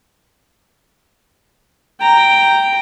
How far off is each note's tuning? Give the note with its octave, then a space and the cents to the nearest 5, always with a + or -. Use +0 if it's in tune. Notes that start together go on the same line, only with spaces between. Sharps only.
G5 +0 A#5 -5